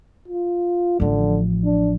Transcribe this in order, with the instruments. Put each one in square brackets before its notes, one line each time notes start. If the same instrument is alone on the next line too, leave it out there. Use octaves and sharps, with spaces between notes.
[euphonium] F4
[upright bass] A1 F3 [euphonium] D3
[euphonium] D4